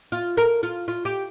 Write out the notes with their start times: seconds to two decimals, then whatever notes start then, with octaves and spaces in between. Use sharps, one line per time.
0.12 F4
0.37 A#4
0.63 F4
0.88 F4
1.05 G4